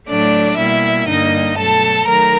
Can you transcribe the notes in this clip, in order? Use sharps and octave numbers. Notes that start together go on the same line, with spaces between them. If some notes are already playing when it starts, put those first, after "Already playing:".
A2 F#3 A3 D4 D5
B2 G3 A#3 E4 E5
G2 D3 G3 A#3 D#4 D#5
B2 F#3 A3 A4 A5
D#3 F#3 A3 A#4 A#5